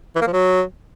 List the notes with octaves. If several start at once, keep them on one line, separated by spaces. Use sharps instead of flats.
E3
A#3
F3
F#3